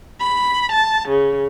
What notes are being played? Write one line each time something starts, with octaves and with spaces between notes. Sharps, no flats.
B5
A5
C#3